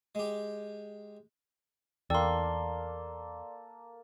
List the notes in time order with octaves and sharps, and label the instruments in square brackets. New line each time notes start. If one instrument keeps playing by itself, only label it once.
[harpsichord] G#3 G4
[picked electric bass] E2 [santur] A#3 A4 [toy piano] D#4 G5 E6 [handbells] D5 C6